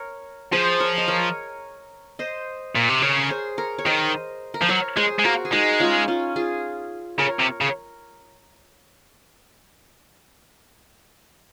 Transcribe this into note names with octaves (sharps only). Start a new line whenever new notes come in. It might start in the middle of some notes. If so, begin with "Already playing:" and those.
Already playing: A#4 C#5
F3 G#4 C5
A#4 C#5
D#5
A#4 C#5
C5 D#5
A#2
C3
C#3 A#4 C#5
G#4 C5
A#4 C#5
C#5
D#3 C5 D#5
A#4
F3 C5
F#3 A#4 C#5
G#3 G#4 C5
G#3
A#3 F#4 A#4
G#4
G#3 D#4 F#4
C#4 F4
C#4 F4
F4 G#4
C#3 A#4 C#5
C3
C#3